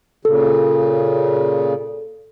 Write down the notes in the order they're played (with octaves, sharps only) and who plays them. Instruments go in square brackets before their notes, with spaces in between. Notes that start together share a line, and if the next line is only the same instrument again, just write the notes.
[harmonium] A#2 C#3 [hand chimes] A4